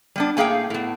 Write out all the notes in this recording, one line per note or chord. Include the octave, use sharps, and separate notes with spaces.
G3 B3 D4
A2 A#3 G#4 F5 G5
A2 B3